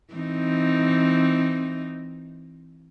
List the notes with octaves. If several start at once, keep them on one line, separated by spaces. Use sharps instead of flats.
E3 C4 D#4